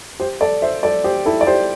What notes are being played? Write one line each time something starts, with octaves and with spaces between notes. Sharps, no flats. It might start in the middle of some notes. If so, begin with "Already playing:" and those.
G4 C5
A4 D5
C5 E5
A4 D5
G4 C5
E4 A4
D5
G4 C5